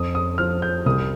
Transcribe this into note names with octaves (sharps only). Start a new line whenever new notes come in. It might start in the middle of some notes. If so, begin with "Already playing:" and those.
Already playing: F2 D#6
D#6
F3 F6
G6
C2 D#6